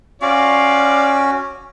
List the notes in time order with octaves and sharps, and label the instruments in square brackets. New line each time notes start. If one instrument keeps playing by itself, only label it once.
[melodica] C#4 F#4 [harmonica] F4 D5 F5